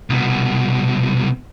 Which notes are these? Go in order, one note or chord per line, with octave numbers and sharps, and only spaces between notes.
C2 B2